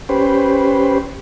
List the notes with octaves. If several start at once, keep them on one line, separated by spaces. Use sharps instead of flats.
C#4 G4 B4 C5